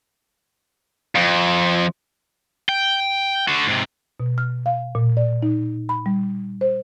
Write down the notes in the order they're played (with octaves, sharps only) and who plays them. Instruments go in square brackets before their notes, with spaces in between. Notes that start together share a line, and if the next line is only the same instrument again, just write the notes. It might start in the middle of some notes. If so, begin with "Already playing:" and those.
[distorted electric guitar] F2
G5
D3 F#4
G#2 C3
[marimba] B2
F6
F5
A#2
D5
D#4
B5
G3
C5